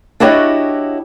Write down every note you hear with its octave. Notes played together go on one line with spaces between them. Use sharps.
D4 E4 F#4 G4 C#5 D#5